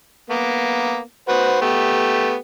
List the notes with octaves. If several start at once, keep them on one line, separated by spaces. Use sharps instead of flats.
A#3 B3
F#4 B4 C5
A3 B3 G4